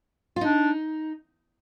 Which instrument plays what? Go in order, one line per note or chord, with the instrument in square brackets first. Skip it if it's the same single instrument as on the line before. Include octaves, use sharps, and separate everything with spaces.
[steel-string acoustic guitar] F4
[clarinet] D4 [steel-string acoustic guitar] D#4